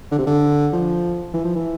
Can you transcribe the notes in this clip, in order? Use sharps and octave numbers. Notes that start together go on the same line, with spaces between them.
D3
C3
D3
F3
E3
F3
E3